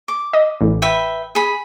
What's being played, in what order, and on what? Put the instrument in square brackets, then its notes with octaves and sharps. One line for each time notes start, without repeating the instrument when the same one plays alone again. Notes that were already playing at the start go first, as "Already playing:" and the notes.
[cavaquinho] D6
[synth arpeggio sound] D#5
A1
[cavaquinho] B4 E5 G5
G#4 B5